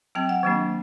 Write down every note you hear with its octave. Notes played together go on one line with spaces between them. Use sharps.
F#3 C4 G5
F#5
D#3 F#3 A#3 D4